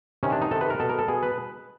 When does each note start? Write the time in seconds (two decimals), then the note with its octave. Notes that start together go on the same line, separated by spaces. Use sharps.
0.23 C3 D#3 C#4
0.32 D4
0.41 D#4
0.51 C3 D#3 A4
0.61 B4
0.70 A#4
0.80 B2 A4
0.89 A#4
0.99 A4
1.08 B2 G#4
1.23 B4